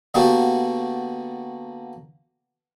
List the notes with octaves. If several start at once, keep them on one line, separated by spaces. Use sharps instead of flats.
D3 A#3 B3 D4 F#4 G4